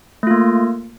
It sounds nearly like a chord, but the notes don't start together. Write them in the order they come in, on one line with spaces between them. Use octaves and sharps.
A3 F4 A#3